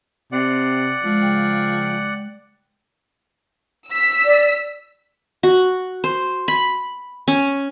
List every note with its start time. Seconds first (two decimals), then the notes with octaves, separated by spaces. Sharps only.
0.32 C3 C4 D5 F#5
1.04 F3 G#3
1.21 C#3 G5
3.89 E6 B6
4.26 D5
5.43 F#4
6.04 C5
6.48 B5
7.28 C#4